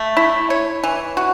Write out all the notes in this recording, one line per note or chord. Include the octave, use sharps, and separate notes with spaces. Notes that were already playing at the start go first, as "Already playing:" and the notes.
Already playing: A3
E4
C#5
E3
F#4